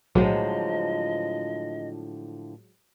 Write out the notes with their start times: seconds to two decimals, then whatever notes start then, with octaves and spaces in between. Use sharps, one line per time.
0.15 B1 A2 D3 F3 F#3 G#3 C5 D#5